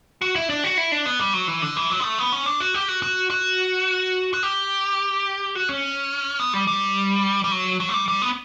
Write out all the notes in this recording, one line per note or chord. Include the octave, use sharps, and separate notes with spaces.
F#4
E4
D4
F#4
E4
D4
B3
G3
F#3
E3
D3
E3
F#3
B3
A3
B3
C#4
D4
F#4
G4
F#4
F#4
F#4
F#4
G4
F#4
C#4
B3
G3
G3
G3
F#3
F#3
A3
G3
G3
B3